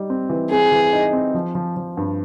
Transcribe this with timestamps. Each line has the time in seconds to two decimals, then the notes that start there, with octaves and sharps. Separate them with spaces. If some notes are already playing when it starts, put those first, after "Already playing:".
Already playing: G3 D#4
0.10 C4
0.29 E3
0.51 C4 G#4
0.72 E3
0.93 D#4
1.13 C4
1.34 F3
1.55 F3
1.77 F3
1.97 G2